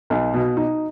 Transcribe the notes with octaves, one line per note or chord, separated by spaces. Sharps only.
B1
B2
D#4